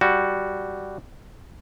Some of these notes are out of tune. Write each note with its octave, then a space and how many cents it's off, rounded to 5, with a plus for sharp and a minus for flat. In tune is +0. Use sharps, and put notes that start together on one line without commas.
G3 +0 F#4 +0